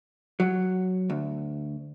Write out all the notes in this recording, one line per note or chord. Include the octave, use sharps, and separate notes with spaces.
F#3
D2